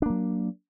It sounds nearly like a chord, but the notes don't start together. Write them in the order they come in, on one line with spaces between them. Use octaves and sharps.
D4 A#3 F#3